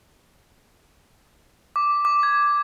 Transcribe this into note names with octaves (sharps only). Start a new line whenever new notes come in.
D6
D6
G#6